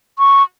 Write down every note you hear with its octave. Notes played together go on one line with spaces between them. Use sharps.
C#6